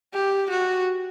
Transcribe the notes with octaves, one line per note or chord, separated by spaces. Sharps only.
G4
F#4